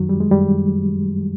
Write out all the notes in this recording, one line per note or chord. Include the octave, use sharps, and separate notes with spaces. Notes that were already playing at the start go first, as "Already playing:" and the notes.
Already playing: F#2 D#3 F#3
G3
G#3
F#2 D#3 G3